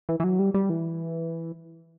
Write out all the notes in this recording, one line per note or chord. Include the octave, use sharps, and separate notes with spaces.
E3
E3
F#3
G3
G3
E3